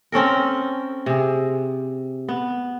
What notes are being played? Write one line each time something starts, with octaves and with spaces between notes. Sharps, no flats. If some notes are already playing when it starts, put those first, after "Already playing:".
C4 C#4 A4 A#4
C3 G#4
B3